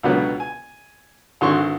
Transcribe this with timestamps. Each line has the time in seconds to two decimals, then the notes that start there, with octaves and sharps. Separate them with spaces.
0.03 C#2 B2 D3 F#3 B3
0.40 G#5
1.41 G#1 D3 E3 F#4 C6 C#6